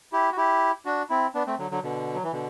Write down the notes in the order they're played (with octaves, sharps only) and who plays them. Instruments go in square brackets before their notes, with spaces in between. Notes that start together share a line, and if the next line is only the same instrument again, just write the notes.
[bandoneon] E4 G4
F#4
E4 G4
D4 F#4
C4 E4
B3 D4
A3 C4
D3 F#3
D3 F#3
B2 D3
F#3
E3
B2 D3